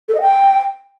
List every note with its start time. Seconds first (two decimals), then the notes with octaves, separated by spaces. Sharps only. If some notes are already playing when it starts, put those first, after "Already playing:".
0.08 A4
0.14 D#5
0.21 G5